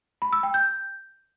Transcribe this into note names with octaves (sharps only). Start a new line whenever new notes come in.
B5
E6
G5
G6